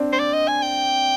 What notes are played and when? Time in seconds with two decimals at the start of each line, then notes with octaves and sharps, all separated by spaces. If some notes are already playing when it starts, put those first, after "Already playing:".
Already playing: C4 D4
0.12 C5
0.19 D5
0.33 D#5
0.48 G#5
0.62 G5